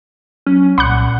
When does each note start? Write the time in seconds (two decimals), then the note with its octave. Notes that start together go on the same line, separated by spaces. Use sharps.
0.46 F#3 C#4
0.78 C2 A#2 F#5 B5 D6 F#6